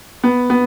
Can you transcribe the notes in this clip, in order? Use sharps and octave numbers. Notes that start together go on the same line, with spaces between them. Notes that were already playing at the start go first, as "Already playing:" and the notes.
B3
B3